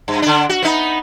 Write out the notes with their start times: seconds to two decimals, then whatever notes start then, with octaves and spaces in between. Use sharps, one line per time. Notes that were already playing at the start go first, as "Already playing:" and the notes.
0.08 G2
0.22 D3 D4
0.49 F#4
0.62 B3 D#4